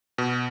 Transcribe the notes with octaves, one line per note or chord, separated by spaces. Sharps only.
B2